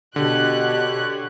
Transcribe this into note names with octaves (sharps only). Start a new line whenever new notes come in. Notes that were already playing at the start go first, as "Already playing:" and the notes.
B2 D3 G4 C#5 F#6